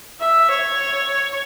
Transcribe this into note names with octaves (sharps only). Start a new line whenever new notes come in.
E5
C#5